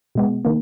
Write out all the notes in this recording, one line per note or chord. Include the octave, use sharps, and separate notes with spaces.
B2 G#3 B3
D#3 A#3